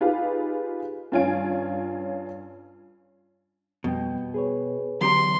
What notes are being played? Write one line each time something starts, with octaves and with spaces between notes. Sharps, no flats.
D#4 F4 G4 G#4 B4 F5
G2 C#4 F4 C#5 G#5 D7
F2 B2 G3 G5
G#4 B4 C#5
E2 D3 F#3 G4 A#5 C6